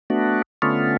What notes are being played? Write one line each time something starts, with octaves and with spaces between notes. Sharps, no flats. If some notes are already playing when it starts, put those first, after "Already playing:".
A3 B3 D4 F#4
D3 A3 B3 C#4 F4